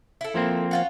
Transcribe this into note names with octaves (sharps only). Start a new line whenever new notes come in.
E4 A4
F3 A#3 C4
C#4 F4 F#4